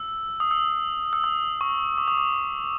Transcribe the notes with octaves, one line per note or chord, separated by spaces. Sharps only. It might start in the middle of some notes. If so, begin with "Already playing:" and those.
Already playing: E6
D#6
E6
E6
D#6
C#6
D6
D#6
D6